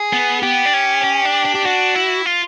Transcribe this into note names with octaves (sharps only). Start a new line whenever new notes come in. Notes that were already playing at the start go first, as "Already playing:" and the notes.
Already playing: G#4
B3
B3 G4
D4
C#4
C#4
D4
D4
G4
D4 F#4
E4
F4